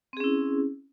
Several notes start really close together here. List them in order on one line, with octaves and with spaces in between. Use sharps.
C4 G#4 C#4 E4